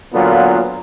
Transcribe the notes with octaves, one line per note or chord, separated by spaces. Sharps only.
A#2 D3 F#3 A#3 B3 F4